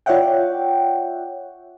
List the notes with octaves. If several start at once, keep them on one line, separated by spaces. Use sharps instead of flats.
F4 C#5 D5 E5 F#5 G5